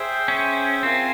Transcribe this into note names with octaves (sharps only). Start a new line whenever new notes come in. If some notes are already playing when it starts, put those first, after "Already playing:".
Already playing: G#4 C5 E5 G5
C#4
C4 F4 A#4 F5 G#5